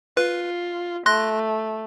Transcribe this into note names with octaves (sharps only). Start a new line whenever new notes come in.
F4 B4
A3 C6 F#6 A#6